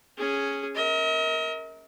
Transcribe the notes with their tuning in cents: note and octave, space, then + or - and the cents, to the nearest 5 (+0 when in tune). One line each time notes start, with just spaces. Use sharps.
C#4 +0 G#4 +0
A#4 +0 D#5 +45